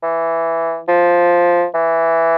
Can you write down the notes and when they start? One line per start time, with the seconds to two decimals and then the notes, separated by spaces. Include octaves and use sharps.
0.03 E3
0.88 F3
1.74 E3